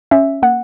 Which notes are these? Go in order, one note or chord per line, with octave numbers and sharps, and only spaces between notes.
C#4 E5
A#3 F#5